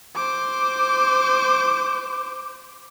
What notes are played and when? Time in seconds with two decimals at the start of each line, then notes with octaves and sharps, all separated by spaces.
0.15 C5 D6